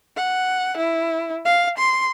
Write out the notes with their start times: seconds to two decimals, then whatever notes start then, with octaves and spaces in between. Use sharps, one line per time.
0.17 F#5
0.77 E4
1.45 F5
1.78 C6